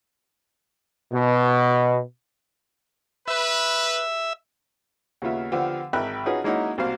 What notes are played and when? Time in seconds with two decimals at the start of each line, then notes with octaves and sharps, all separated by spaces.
1.13 B2
3.28 B4 E5
5.22 D#2 C#3 B3 F4 E5
5.52 D3 F3 B3 F4 G4
5.93 G#1 A#4 E5 G5 B5 F#6
6.26 C#4 D#4 F4 F#4 G#4 B4
6.44 G#3 A#3 C#4 D#4 E4 F#4
6.78 C2 B2 A#3 C5 F5